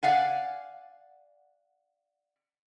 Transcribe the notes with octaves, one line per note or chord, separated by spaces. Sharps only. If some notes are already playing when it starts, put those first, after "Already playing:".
D5 F5 F#5 G#5